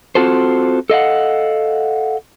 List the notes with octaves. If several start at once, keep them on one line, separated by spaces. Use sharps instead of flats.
C4 F4 F#4 A4 C5
A4 D#5 F5 F#5